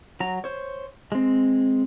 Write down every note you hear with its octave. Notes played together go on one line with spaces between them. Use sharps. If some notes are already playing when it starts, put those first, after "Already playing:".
F#3 A#5
C5 C#5
G#3 C4